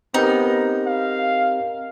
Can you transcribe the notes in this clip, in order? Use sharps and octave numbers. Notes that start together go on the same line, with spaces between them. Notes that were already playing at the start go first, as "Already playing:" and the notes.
B3 C4 D#4 G4 A#4
F5